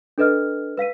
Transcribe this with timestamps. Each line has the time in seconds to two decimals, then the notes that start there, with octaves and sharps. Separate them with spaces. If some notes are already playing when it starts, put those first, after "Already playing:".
0.18 D4 A4 B4 D#5 F6
0.77 B4 F5 B6 D#7